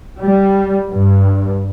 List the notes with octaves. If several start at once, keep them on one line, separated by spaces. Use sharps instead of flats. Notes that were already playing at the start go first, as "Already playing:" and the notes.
G3
G2